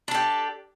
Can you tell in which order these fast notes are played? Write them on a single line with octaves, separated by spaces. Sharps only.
D4 A4 G4